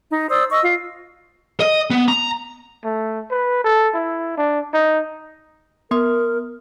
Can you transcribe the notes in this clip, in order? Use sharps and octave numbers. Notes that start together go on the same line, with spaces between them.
D#4
C5 D5 D#6 E6
D#5 C#6 E6
F4
D#5
B3
A#5
A3
B4
A4
E4
D4
D#4
B3 A#4 C6 D#6